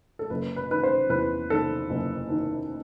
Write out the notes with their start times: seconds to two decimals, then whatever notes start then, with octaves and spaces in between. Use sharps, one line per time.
0.19 A4
0.30 F#1 B4
0.56 B4
0.70 D#3 B4
0.83 C5
1.09 E2 B4
1.50 D#3 A4
1.90 F#1
2.29 D#3